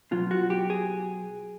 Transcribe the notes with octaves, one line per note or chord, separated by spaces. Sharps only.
B2 F#3 F4
F#4
G4
G#4